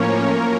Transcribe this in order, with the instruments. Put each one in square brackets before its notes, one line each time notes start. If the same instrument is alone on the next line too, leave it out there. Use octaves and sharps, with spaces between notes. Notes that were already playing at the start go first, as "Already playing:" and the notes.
Already playing: [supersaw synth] A2 F3 A#3 C#4 A#4 C#5
F#3 A#3